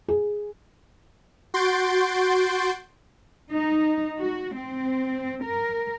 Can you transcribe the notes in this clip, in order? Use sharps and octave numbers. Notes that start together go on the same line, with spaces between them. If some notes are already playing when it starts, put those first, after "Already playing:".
G#4
F#4 C6 G6 A6 D7
D#4
F#4
C4
A#4